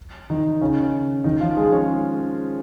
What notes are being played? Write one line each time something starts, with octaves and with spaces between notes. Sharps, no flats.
D#3 D#4
C#3 C#4
D#3 D#4
F3 F4
G#3 G#4
C#4 C#5